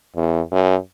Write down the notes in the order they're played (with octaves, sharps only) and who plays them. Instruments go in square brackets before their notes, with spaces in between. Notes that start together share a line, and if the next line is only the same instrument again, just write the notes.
[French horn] E2
F#2